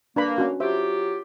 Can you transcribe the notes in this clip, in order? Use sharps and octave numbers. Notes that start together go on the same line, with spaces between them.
A#3 D4 B4 B5
C#4 F#4
F#3 F4 G4 C5 E5